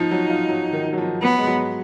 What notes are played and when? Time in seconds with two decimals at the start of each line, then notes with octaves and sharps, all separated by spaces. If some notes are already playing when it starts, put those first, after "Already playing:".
Already playing: F3 D#4
0.11 F#3
0.30 F4
0.49 F#3
0.73 D#3
0.93 F#3
0.98 F3
1.22 F#3 B3
1.38 G#3
1.47 F#3